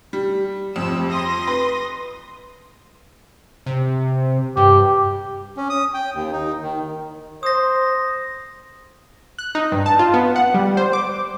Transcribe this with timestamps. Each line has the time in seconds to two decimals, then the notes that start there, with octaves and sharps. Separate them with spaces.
0.13 G3
0.76 F2 C3 E6
1.10 C6 D#6 A#6
1.47 B4
3.66 C3
4.57 G2 G4
5.57 C#4
5.70 D#6
5.94 G5
6.14 D#2
6.32 D#4
6.62 D#3
7.43 C5 D#6 A#6
9.38 F#6
9.55 D#4
9.72 G2
9.86 A5
9.99 F4
10.14 B3
10.36 F#5
10.54 G3
10.77 C5
10.93 D6